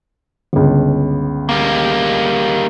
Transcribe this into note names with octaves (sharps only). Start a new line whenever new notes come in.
G1 C#2
G3 A#3